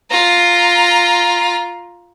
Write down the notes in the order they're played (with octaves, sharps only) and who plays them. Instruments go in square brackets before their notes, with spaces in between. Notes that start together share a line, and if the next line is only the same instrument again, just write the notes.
[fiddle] F4 A#5